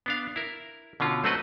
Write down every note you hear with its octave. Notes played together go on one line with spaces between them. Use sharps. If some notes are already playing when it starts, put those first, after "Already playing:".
B3 D4 F5
E4 A#4
B2 D3 C#4 F4
F#3 A3 C4 F#4 B4 D#5